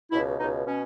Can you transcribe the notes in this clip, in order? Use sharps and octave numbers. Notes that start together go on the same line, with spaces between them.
C#2 B2 E4
C#2 B2 D#4
B2 C#4